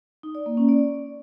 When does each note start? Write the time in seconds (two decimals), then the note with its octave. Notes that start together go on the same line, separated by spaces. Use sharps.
0.23 D#4
0.35 D5
0.46 A#3
0.57 C#4
0.69 D5